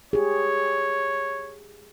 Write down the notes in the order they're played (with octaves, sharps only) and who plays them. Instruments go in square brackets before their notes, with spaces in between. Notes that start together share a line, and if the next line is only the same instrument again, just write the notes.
[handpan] G4 G#4 [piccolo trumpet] C#5